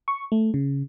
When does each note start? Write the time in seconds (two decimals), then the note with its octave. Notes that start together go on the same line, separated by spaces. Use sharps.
0.08 C#6
0.32 A3
0.54 C#3